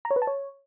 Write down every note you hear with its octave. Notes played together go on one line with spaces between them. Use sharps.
A#5
C#5
B4
A5
C#5